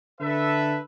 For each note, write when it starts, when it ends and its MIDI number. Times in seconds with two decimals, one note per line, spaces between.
0.20 0.78 50
0.20 0.78 69
0.20 0.78 71
0.20 0.78 76